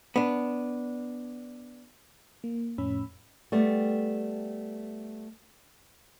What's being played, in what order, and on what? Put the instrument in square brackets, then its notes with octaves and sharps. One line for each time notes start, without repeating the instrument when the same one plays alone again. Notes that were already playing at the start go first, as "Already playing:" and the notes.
[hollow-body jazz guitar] B3 D4
[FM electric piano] A#3
F2 A2 C#4 B5 E6
[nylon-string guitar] G3 A3 B3